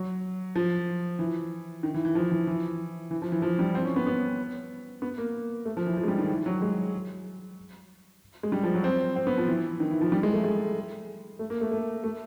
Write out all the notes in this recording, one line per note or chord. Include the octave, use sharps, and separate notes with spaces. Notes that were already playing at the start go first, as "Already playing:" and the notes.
Already playing: F#3
F3
E3
D#3
E3
E3
F3
E3
E3
E3
F3
E3
F3
G3
C4
C#4
B3
B3
B3
A#3
A3
F3
E3
F3
G#3
G3
D#3
E3
F#3
G#3
G#3
G3
F3
F#3
C4
C4
B3
F3
E3
D#3
E3
F3
G3
G#3
A3
G#3
A3
A#3
A3
A3
A3